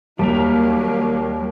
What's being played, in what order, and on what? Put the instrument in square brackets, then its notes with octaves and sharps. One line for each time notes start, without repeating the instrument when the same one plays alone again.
[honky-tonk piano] D#2 B6 [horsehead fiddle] F#3 A#3 [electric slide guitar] G3 G4 A#4